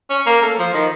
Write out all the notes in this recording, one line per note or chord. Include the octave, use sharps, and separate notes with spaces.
C#4
A#3
A3
F3
D#3